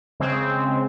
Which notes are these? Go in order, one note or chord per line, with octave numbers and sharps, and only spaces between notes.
C#3 G#3 C4